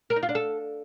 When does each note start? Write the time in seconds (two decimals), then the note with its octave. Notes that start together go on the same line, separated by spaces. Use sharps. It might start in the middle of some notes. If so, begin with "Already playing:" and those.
0.10 A#4
0.16 D#4
0.23 F4
0.29 D4
0.35 A4